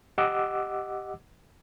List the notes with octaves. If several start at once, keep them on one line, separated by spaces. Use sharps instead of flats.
G4 D#5 F#5 D6 E6